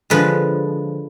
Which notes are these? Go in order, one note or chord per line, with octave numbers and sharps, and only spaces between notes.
D3 F3 G#3 B4